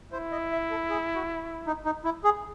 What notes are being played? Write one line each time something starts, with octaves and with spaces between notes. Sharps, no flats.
E4 C5
D#5
E5
A4
G#4
F#4
D#4
D#4
E4
G#4